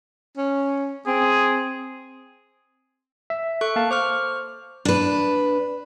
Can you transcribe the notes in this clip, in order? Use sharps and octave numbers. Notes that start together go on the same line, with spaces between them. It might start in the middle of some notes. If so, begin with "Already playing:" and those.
C#4
C4 G#4
E5
A4 C#6 F#6
A#3 F5 A5
C5 C#6 D6 F6
D4 B4